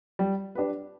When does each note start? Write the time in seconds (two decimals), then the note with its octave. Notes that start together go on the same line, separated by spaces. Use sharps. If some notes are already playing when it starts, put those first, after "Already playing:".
0.19 G3
0.55 D4 G4 B4